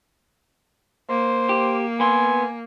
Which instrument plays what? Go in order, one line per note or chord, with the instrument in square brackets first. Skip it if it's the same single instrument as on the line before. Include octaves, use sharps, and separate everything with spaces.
[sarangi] A#3 [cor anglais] C5
[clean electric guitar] G4
[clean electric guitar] B3 C6 [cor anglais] G#5